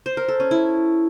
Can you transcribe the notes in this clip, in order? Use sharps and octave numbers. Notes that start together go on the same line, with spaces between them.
C5
A#4
A4
C#4
E4